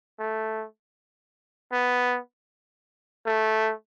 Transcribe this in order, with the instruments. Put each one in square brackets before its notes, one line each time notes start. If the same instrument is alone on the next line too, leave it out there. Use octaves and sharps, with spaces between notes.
[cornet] A3
B3
A3